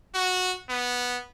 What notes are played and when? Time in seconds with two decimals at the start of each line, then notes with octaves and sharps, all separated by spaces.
0.15 F#4
0.69 B3